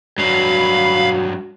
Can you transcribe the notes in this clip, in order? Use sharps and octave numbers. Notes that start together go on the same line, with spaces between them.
G2 F#3 F#4 F5 B5